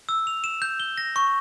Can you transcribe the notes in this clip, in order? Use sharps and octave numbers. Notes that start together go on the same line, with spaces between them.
E6
F7
E7
G6
G7
A#6
C#6